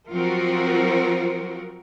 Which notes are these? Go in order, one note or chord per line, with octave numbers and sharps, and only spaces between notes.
F3 F#3 C4 F4 F#4 A#4